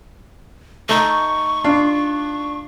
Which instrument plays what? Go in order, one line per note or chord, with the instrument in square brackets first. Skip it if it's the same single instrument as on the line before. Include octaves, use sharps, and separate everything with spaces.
[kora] A3 D#4 [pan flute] C#6
[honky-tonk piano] D4 [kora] F4